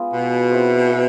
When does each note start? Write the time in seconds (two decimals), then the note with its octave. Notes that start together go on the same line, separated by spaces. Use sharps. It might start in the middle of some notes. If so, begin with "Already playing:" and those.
Already playing: G#3 B3 F4 G#4
0.14 B2
0.51 C4 E4 G#4 C5